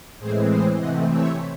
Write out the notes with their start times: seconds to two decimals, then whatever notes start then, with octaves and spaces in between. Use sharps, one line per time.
0.19 A2 E3 G#3 C4 G#4 C5
0.49 C5 D#5
0.78 C3 E3 A3 C4 D#5 F#5
1.08 C#5 E5